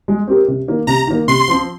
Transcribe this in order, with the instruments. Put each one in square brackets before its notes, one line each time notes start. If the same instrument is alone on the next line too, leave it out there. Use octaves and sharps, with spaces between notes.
[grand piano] G#3
C4 G4 A#4
C3
D#3 A#3
[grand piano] C3 [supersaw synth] A#5
[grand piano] D#3 A#3
[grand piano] C3 [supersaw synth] C6
[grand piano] F3 C4